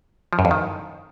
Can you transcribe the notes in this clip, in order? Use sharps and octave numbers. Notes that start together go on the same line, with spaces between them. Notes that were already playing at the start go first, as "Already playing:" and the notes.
F3
F#2
F2
D#3